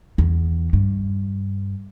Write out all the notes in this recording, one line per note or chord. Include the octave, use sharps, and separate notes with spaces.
E2
G2